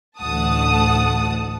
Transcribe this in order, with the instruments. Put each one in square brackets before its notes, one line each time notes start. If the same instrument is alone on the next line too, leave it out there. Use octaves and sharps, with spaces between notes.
[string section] A1 D2 A3 F#5 A5 D#6